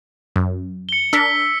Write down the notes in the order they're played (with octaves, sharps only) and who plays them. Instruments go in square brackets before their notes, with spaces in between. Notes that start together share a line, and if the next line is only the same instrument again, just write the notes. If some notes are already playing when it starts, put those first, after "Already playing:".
[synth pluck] F#2
[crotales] C#7 G7
[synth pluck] D4 A#4 [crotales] E6 B6